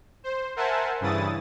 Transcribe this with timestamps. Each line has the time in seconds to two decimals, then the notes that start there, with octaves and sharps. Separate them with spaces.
0.24 C5
0.56 A#4 C5 E5 F#5 G#5 A5
1.00 G2 C#3 E3 E4 D#6 A6